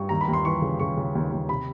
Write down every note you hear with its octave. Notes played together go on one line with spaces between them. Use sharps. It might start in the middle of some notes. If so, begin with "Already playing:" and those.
Already playing: G2 C#6
D#2 A#5
B5
D#2
C6
E3 C#6
C#3
C#3 C#6
C#3
D#2
D#2
C3 B5